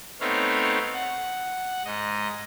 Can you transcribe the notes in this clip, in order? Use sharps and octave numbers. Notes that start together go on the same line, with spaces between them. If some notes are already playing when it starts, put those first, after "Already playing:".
A3 B3 C4 D#4 C#5 F5
F#5
G#2 D#5